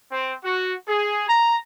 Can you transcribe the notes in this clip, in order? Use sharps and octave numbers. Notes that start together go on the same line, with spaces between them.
C4
F#4
G#4
A#5